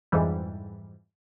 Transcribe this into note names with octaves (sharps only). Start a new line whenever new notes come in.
F2 G#2 E3 G3